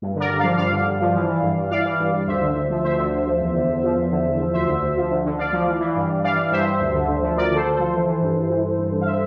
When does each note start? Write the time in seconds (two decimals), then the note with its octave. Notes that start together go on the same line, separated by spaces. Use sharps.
0.02 G2
0.15 D3 A#4 D5
0.29 G2
0.39 F3 D5 F5
0.57 G2 D5 F5
0.73 D3
0.86 G2
1.01 F3
1.15 E3
1.28 E3
1.43 G2
1.56 G2
1.70 E3 D5 F5
1.85 E3
2.00 G2
2.13 G2
2.28 D2 C5 E5
2.41 D3
2.56 D2
2.70 F3
2.84 D2 C5 E5
2.98 D3
3.13 D2
3.27 F3
3.41 E2
3.55 D3
3.69 E2
3.83 F3
3.97 E2
4.11 D3
4.26 E2
4.40 F3
4.53 D2 C5 E5
4.68 D3
4.82 D2
4.97 F3
5.11 D2
5.25 D3
5.38 D2 D5 F5
5.53 F3
5.68 E3
5.81 E3
5.96 G2
6.09 G2
6.23 E3 D5 F5
6.38 E3
6.52 G2 C5 E5
6.66 G2
6.81 D2
6.94 D3
7.08 D2
7.23 F3
7.37 D2 A#4 D5
7.51 D3 A4 C5
7.65 D2
7.75 F3 A4 C5
7.94 E3
8.08 E3
8.21 G2
8.36 G2
8.50 E3
8.65 E3
8.78 G2
8.92 G2
9.01 F5
9.06 C5 E5